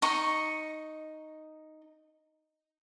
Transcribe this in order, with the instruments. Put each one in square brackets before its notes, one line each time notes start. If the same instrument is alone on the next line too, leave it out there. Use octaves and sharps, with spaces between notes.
[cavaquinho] D#4 D#5 C#6